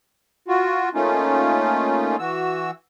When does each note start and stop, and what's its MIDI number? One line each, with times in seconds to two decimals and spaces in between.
0.48 0.89 65
0.48 0.89 66
0.95 2.16 57
0.95 2.16 58
0.95 2.16 61
0.95 2.16 63
0.95 2.16 65
2.19 2.71 52
2.19 2.71 66
2.19 2.71 88